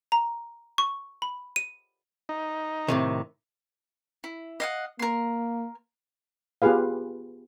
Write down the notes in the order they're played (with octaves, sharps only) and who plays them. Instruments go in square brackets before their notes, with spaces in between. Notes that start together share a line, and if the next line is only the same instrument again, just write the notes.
[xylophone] A#5
C#6
B5
D#7
[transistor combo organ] D#4
[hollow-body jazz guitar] A2 C3 D#3
[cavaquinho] E4
D#5 F5 F#5
[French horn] A#3 [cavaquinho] A#4 C6
[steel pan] B3 F4 G4 G#4 B4 F5